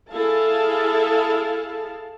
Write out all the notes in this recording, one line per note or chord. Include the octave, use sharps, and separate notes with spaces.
E4 G#4 A4 F5 A5